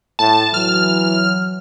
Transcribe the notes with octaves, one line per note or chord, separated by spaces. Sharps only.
A2 A5
E3 F#3 F6